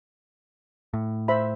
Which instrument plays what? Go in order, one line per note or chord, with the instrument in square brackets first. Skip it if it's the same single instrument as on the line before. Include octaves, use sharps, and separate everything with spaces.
[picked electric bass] A2
[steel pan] C5 E5 B5